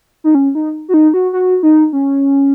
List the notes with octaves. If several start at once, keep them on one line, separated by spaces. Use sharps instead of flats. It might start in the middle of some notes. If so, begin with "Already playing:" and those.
D#4
C#4
D#4
F#4
D#4
F#4
F#4
D#4
C#4